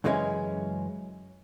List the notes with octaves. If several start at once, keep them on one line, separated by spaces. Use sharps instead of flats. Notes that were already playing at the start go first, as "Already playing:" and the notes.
F#2 C#3 E3 G#3 C4 C#4